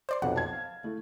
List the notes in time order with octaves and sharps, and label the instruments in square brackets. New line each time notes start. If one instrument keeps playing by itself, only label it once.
[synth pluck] C5 D5 C6
[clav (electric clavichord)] B1 F2 [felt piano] C3 [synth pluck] F#5
[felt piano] A5 G#6
[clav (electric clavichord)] F5
[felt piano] A3 E4